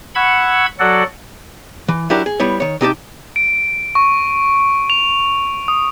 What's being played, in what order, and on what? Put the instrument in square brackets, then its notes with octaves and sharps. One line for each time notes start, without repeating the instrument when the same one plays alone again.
[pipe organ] F#5 B5 C#6 E6 G#6
F#3 F#4 A4 D5 F#5
[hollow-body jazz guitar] E3
F#3 D4 E4 G4 A#4
G#4
G3 B3 E4 C#5
D#3 C#5
C3 D#4 G4 A5
[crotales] D7
C#6
F7
D#6